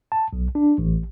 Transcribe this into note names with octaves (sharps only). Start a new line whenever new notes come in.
A5
B1
D4
A1